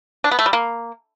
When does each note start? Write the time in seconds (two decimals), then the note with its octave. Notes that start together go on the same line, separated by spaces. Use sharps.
0.24 D4
0.31 B3
0.39 A3
0.46 G3
0.53 A#3